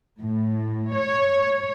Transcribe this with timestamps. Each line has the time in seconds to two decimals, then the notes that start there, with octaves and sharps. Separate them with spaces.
0.19 A2
0.94 C#5